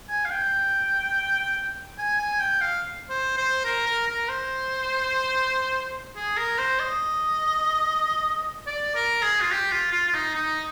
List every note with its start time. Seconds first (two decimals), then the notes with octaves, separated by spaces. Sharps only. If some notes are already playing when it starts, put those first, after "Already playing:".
0.09 G#5
0.25 F5
0.30 G5
1.99 G#5
2.19 G#5
2.40 G5
2.61 F5
3.09 C5
3.37 C5
3.65 A#4
3.86 A#4
4.07 A#4
4.29 C5
6.16 G#4
6.37 A#4
6.58 C5
6.80 D#5
8.67 D5
8.95 A#4
9.23 G#4
9.41 F4
9.51 G4
9.72 F4
9.92 F4
10.08 F4
10.14 D#4
10.35 D#4